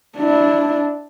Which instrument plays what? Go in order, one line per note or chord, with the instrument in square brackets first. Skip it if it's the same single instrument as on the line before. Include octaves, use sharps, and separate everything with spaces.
[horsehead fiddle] D4 E4